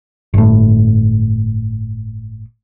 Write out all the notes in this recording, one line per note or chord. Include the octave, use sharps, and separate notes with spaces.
G1 A2